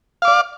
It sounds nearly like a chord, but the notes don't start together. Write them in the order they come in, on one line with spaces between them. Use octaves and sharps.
F5 D6 D5